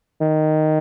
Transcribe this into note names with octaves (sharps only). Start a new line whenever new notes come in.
D#3